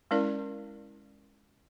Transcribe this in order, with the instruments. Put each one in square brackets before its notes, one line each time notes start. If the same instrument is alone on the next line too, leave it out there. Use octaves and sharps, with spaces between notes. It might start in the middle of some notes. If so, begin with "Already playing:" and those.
[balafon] G#3 C#4 E4 A#4 D5